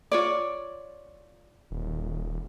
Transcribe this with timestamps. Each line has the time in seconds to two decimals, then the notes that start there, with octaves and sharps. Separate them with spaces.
0.12 F4 C#5 D5
1.71 D#1